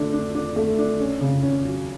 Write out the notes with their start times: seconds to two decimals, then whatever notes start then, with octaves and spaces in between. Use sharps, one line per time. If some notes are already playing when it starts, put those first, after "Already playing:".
Already playing: D3 A3 D4
0.13 D4
0.35 D4
0.56 A3
0.79 D4
1.00 C#4
1.21 C#3
1.43 C#4
1.65 F#3